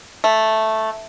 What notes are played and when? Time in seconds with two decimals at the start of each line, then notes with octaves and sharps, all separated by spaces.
0.24 A3